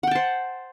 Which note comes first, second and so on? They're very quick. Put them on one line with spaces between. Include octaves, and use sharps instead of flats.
F#5 G5 A5 C5